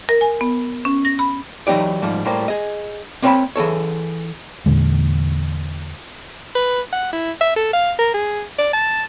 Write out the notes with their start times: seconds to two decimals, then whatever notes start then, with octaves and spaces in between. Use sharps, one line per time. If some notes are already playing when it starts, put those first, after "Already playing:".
0.09 A#4
0.21 G#5
0.41 B3
0.85 C#4
1.05 A#6
1.19 B5
1.67 E3 F#3 D#4 G4 D5
2.02 G#2 F3 G3
2.25 A2 G3 A#3 C5
2.48 G#4 D#5
3.22 A#3 C4 C#5 F5 A5 B5
3.56 E3 G#4 A4 C#5
4.66 E2 A#2 D3 G#3
6.55 B4
6.93 F#5
7.13 E4
7.41 E5
7.56 A4
7.73 F5
7.98 A#4
8.14 G#4
8.58 D5
8.73 A5